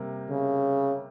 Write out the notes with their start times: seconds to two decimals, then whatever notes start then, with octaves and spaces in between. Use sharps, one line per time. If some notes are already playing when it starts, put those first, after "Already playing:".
Already playing: C3 G3 A#3
0.30 C#3